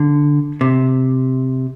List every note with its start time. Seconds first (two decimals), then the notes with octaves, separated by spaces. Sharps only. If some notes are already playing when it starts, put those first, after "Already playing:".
Already playing: D3
0.61 C3